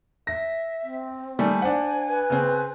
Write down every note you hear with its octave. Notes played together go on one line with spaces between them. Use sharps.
E5 A#6
C4
D#3 G3 A3 G#5
D4 C5 F#5
B4
C#3 C4